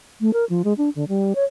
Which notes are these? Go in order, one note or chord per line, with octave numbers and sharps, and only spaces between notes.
A3
A#4
F3
G#3
D4
D3
G3
C#5